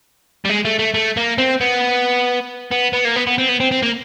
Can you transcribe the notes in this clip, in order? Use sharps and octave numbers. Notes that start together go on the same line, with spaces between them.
G3
G#3
A3
A3
A3
A#3
C4
B3
B3
B3
A#3
B3
B3
C4
B3
C4
C4
A#3